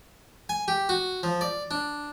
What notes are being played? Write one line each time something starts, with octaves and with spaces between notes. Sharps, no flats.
G#5
G4
F#4
F3
D5
D4